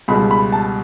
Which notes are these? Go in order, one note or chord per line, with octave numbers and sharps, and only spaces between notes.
C#2 B2 G3 B5
B5
A5